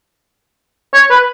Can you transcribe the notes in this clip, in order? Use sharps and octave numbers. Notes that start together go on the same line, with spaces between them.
C#5
B4